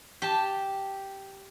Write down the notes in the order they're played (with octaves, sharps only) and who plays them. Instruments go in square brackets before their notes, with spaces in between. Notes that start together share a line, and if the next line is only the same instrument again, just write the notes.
[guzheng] G4 A5